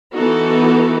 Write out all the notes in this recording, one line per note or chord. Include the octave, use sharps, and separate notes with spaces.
E3 B3 D#4 F#4 A4